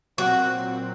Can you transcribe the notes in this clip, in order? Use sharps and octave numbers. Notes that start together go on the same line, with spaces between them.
A#2 F#3 C4 F#4